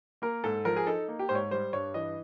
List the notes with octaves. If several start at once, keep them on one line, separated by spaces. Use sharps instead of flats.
A#3 A#4
G#2 A4
F3 A#4
G#4
D#4 A4
A#3
G4
G#2 C5
C#5
G3 C5
G2 C#5
E3 D#5